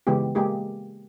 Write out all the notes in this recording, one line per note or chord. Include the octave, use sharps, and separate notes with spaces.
C#3 E3 G#3 B3 G4
G#3 A#3 G4 G#4